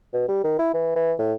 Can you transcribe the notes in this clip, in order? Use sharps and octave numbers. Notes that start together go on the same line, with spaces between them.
B2
G3
D#3
E4
E3
E3
A2